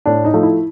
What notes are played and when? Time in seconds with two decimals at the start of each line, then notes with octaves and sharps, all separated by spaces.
0.06 A2 D4
0.24 D#4
0.34 F3 A3
0.43 E4